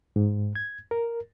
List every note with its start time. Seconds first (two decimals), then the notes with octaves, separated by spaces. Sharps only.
0.16 G#2
0.55 G#6
0.91 A#4